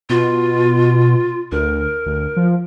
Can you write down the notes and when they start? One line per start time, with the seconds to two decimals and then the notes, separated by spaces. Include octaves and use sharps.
0.10 B2 F4
1.52 D2 A#4
2.06 D2
2.37 F3